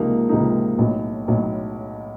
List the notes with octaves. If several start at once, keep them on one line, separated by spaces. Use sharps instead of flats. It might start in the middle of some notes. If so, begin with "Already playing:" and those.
Already playing: C#2 C3 F3 A#3 D#4
C#2 C3 F3 A#3 D#4
B1 A2 F#3
B1 A2 F#3